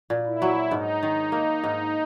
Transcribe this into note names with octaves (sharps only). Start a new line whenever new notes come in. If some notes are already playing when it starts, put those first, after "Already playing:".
A#2
E4
F#3
G#2 D#4
D#3
A#3
G#2